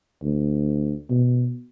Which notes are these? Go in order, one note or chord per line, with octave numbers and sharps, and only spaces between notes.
D2
B2